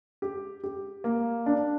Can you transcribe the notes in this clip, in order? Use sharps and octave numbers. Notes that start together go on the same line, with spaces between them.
G4
G4
A#3
D4